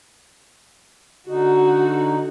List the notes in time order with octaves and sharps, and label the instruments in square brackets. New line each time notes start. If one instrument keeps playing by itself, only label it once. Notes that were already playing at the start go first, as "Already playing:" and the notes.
[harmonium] D3 D#4 [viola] F#4